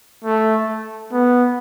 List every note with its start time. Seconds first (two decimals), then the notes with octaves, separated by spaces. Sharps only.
0.24 A3
1.12 B3